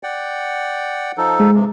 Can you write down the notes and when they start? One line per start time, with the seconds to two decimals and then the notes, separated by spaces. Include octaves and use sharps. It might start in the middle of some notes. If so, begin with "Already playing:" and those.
0.03 D5 F#5 G5
1.18 F3 D#4 A4
1.39 G#3
1.54 G2 C3